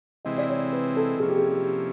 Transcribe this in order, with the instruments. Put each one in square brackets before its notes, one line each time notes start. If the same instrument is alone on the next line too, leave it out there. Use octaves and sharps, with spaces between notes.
[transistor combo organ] C3 E3 G#3 C4 E4 [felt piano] D#5
[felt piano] D5
C#5
B4
A4
[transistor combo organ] C3 F3 A#3 C#4 E4 [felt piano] G#4
[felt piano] G4
G#4
G4